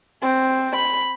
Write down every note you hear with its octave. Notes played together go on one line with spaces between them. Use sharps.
C4
B5